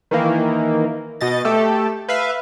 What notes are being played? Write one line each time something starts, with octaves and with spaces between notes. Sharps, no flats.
D#3 E3 A#3
B2 D#5 A6
A3 G4 A4
B4 E5 F5